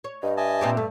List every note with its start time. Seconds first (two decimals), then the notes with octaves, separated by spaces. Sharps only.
0.04 C#5
0.23 G2 D#5
0.37 D#5 E5 G#5 A5
0.61 A#2 C4 G4
0.77 G2 A3